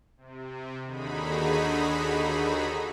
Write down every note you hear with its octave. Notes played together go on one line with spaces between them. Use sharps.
C3
D#2 D3 D#4 F#4 G#4 B5